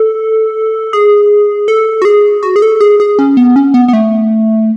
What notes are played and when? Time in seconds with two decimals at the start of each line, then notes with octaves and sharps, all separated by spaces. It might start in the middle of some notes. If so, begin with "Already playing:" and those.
Already playing: A4
0.93 G#4
1.68 A4
2.02 F#4
2.05 G#4
2.43 F#4
2.56 G#4
2.62 A4
2.81 G#4
3.00 G#4
3.19 C#4
3.37 B3
3.56 C#4
3.74 B3
3.88 B3
3.93 A3